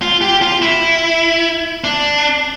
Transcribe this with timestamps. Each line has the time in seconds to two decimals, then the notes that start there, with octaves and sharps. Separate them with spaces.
0.02 F4
0.22 G4
0.42 F4
0.62 E4
1.84 D4